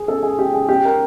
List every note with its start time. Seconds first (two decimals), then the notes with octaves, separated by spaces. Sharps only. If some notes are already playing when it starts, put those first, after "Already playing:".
Already playing: G#4
0.08 A4
0.23 G#4
0.39 G4
0.53 G#4
0.69 G4
0.85 A#4